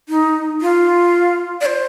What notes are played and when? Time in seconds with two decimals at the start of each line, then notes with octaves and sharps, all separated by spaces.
0.09 D#4
0.62 F4
1.61 D5
1.66 C5